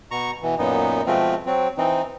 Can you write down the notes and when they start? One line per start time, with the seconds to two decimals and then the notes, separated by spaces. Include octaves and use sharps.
0.11 B2 A#5 C#6
0.43 B2 E3
0.59 F#2 A#2 B3 D#4
1.07 B2 F3 G#3 A3 C4 F4
1.46 F#3 C4
1.78 E3 C4 D#4